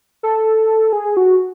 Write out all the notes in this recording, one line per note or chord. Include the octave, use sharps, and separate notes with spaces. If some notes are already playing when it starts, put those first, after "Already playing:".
A4
G#4
F#4